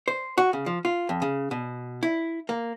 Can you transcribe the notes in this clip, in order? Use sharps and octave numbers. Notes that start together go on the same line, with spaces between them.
C5
F#4
C#3
F3
F4
F2
C#3
B2
E4
A#3